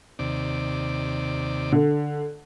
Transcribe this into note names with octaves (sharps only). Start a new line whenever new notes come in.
D#2 C3 D5
D3